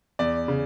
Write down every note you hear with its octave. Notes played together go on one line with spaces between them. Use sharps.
E2 D5
C#3